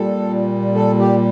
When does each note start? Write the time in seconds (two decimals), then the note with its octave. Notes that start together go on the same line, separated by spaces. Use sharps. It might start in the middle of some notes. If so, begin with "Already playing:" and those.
Already playing: A#2 G3 A4
0.75 A4
0.99 G4